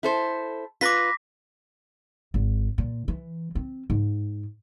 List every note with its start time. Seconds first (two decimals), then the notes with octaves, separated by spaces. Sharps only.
0.03 E4 A4 C5
0.81 F4 B4 D6 A#6 B6
2.34 G#1
2.78 A#2
3.08 E3
3.55 C4
3.90 G#2